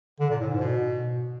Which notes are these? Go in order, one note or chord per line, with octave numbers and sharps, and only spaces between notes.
D3
A#2
A2
G#2
B2